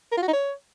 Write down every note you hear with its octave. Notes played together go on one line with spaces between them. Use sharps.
A#4
F4
F#4
D#4
C#5